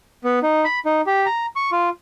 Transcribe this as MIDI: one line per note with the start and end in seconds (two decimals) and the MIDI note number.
0.24 0.39 59
0.43 0.64 63
0.65 0.79 83
0.85 1.01 63
1.07 1.26 67
1.26 1.46 82
1.56 1.70 85
1.72 1.89 65